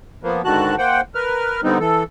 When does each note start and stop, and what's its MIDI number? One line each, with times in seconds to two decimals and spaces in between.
0.23 0.42 53
0.23 0.42 58
0.23 0.42 59
0.45 0.75 44
0.45 0.75 50
0.45 0.75 51
0.45 0.75 66
0.45 0.75 81
0.45 0.75 90
0.78 1.01 58
0.78 1.01 72
0.78 1.01 78
0.78 1.01 79
1.15 1.61 70
1.15 1.61 71
1.15 1.61 89
1.63 1.78 50
1.63 1.78 55
1.63 1.78 59
1.63 1.78 60
1.63 1.78 63
1.80 2.03 52
1.80 2.03 69